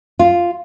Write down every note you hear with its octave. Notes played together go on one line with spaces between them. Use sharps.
F4